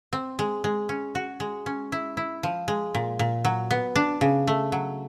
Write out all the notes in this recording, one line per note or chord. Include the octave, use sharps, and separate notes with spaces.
C4
G#3
G#3
C#4
F#4
G#3
C#4
E4
E4
F3
G#3
A#2
A#2
F#3
B3
D4
C#3
A3
F#3